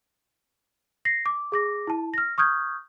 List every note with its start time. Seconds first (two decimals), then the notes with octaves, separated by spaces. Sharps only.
1.05 A#6 C7
1.26 D6
1.52 G#4 D6 A#6
1.87 E4 A5
2.14 F6 A#6
2.38 C#6 D#6 F6 G6 G#6